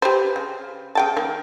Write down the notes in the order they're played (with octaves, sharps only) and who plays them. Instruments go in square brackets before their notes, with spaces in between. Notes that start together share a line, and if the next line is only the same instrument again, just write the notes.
[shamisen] G4 B4 C5
C#3
C#3 G5 A5
D#3 A#3